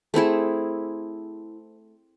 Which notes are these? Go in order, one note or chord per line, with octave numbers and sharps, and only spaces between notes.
A3 C4 E4 G#4